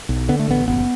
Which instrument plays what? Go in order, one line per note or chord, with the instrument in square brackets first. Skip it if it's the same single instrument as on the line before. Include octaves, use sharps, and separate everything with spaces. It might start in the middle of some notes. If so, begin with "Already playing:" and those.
[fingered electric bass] B1
D3 B3
A3
A1 B3
F#1 B3